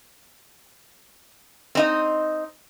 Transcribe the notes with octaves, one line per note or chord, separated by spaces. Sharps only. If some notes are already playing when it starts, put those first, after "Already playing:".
C4 D#4 D#5